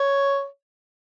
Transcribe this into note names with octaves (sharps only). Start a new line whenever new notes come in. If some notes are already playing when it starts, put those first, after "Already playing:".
Already playing: C#5